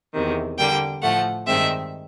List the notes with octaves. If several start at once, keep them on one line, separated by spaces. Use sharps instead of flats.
E2 C3 D#3
D3 G3 A#3 G5
A2 F3 A3 F#5
G2 D#3 G#3 C4 E5